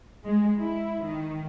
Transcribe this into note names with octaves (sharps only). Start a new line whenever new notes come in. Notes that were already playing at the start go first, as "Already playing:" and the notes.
G#3
E4
D#3